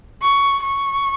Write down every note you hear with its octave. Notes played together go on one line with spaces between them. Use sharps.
C#6
C#6